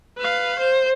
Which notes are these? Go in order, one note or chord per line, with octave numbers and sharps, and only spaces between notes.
B4 F5
C5